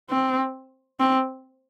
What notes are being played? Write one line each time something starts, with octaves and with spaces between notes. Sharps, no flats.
C4
C4